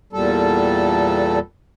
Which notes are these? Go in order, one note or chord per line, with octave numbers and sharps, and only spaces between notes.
E2 A#2 G3 A4